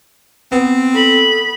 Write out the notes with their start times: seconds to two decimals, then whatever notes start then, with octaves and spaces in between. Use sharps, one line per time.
0.52 B3 C4
0.95 A4 B5